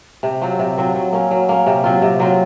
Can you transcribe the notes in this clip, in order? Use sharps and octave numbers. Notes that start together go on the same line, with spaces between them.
C3
F#3 C4 F4
C3
F#3 C4 F4
F#3
A#3 C#4
F#3
A#3 C#4
C3
F#3 C4 F4
C3
F#3 C4 F4